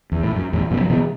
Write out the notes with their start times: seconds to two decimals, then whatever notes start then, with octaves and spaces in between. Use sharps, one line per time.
0.12 E2
0.23 A2
0.35 F#2
0.53 E2 A2
0.71 F#2 B2
0.81 F#3
0.89 B2 E3